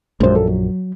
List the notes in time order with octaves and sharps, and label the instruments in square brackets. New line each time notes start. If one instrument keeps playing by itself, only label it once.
[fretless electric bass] A#1 F#2 [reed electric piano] G#3 C5
[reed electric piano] A4
F#3